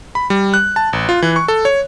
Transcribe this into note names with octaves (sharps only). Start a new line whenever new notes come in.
B5
G3
F#6
A5
A1
F4
E3
C#6
A4
C#5